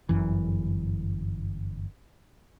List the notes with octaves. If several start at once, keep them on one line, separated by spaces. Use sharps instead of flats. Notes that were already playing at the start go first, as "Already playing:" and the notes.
G1 F#2 E3